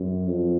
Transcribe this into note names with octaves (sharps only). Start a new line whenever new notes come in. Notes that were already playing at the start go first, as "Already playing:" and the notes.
Already playing: F#2
F2